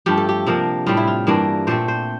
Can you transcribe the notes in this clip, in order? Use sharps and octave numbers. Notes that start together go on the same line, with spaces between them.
G2 F3 A3 G4
A4
G4
C3 F3 A#3 D4
A2 G3 C4 F4
E4
F4
G2 E3 A#3 D4
A#2 A3 C4 C5
C5